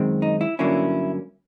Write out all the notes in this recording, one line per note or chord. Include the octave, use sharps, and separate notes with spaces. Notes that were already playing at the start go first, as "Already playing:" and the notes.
Already playing: F#2 D#3 G#3 C4
D#4
E4
G2 D3 F#3 A#3 C#4 E4